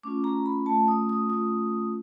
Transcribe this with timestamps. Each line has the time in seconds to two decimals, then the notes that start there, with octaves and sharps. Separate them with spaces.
0.03 A3 C#4 F4 D6
0.24 A#5
0.46 B5
0.66 A3 C#4 F4 A5
0.88 D#6
1.09 D#6
1.30 A3 C#4 F4 D#6